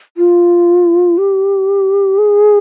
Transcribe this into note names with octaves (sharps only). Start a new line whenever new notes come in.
F4
G4
G#4